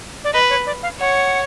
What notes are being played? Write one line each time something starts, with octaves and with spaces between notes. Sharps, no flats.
D5
B4 D#5
C#5
D5
F5
C#5 F#5